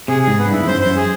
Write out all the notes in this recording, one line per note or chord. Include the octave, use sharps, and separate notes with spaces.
C3 G#4
G#2 G#4
B3
G2 E4
F2
F#2 C5
C5
F#2
G#4